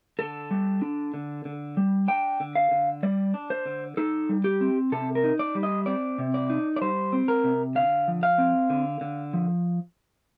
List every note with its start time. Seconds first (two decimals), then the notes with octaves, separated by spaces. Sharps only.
0.19 D3 A4
0.51 G3
0.82 D4
1.14 D3
1.45 D3
1.77 G3
2.08 D4 G5
2.40 D3
2.55 F5
2.71 D3
3.03 G3 D5
3.34 D4
3.50 C5
3.66 D3
3.97 D#4 A4
4.29 G3
4.44 G4
4.61 C4
4.92 C3 A4
5.15 A#4
5.24 D#4
5.39 D5
5.55 G3
5.63 D#5
5.86 C4 D5
6.18 C3
6.34 D5
6.50 D#4
6.76 D5
6.82 G3 C5
7.13 C4
7.28 A#4
7.44 C3
7.75 D3 F5
8.08 F3
8.23 F5
8.38 C4
8.70 D3
9.01 D3
9.34 F3